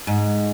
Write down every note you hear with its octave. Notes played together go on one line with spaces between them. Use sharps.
G#2